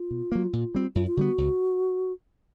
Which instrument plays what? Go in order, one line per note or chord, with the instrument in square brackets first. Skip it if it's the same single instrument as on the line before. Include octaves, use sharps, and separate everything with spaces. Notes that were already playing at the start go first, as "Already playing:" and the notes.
Already playing: [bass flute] F4
[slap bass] B2
F#3 A#3
A#2
G3 C4
[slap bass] F#2 [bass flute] F4
[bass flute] F4
[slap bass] D3 G3 B3 [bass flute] F#4
[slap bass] C#2